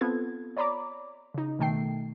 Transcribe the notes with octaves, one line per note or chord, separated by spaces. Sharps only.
B3 C4 F4 A4 G#6
C#5 D5 A#5 B5 D6
C#3 D#4
B2 D#3 A3 G5 C7